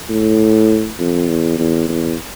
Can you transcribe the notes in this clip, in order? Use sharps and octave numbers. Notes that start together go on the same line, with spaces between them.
A2
F2
E2
E2
E2